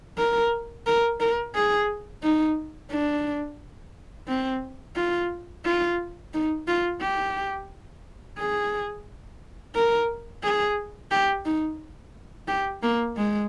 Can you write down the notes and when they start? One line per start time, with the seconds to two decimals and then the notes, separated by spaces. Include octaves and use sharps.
0.18 A#4
0.87 A#4
1.20 A#4
1.55 G#4
2.23 D#4
2.91 D4
4.28 C4
4.96 F4
5.65 F4
6.33 D#4
6.68 F4
7.01 G4
8.38 G#4
9.75 A#4
10.44 G#4
11.11 G4
11.46 D#4
12.48 G4
12.83 A#3
13.17 G#3